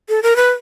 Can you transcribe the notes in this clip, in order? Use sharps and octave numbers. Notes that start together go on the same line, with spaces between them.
A4
A#4
B4